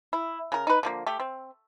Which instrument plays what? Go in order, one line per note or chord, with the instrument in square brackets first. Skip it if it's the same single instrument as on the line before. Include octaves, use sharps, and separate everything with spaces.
[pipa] E4
C#3 A#4
D#4 B4
D3 F3 A#3
A3 G4
C4